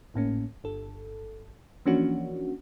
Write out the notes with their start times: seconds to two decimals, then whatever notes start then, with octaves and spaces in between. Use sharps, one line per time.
0.14 G#1 A2 A#3 C#4
0.64 G1 A4
1.86 E3 F3 A#3 C#4 D4 F#4